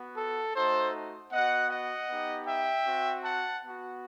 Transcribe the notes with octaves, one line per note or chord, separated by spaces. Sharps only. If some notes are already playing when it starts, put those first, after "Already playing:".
Already playing: B3 F#4
A4
A3 D#4 F#4 A4 C5
B3 F#4 D#5 F#5
D#5 F#5
B3 D#4 G4
E5 G5
C4 F#4
F#5 A5
B3 F#4